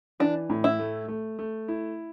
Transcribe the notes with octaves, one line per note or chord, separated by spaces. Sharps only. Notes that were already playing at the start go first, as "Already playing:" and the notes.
E3 D4
A2
E4
A3
A3
A3
E4